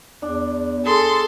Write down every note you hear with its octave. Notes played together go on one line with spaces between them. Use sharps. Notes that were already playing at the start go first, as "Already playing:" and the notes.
E2 D4
G#4 A4 C6